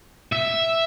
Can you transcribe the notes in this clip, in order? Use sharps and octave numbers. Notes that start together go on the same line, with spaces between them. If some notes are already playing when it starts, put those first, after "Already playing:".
E5